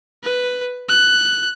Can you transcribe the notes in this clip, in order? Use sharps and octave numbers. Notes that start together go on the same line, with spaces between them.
B4
F#6